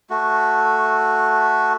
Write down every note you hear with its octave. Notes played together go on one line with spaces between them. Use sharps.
A3 F#4